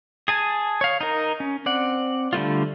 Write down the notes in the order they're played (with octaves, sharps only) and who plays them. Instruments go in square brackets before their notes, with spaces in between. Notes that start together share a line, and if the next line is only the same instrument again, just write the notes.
[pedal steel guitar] G#4 G#5 A5
C#5 F5
D#4 A#4
C#4
C4 D5 F#5
D3 G3 A3 F4